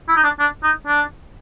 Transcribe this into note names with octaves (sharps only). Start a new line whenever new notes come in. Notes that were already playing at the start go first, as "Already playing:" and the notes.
E4
D#4
D4
D4
D#4
D4